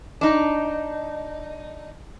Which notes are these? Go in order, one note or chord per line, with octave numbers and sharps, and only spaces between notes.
D4 D#4